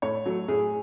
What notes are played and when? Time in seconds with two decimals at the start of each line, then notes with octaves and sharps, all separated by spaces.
0.02 A2 C#5
0.25 F#3 A3
0.48 A2 G#4